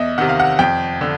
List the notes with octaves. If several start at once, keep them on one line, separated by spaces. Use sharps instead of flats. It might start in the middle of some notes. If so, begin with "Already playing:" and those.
Already playing: E2 D#5 E5
C3 D#3 F#5
F5
F#5
F2 G5
D3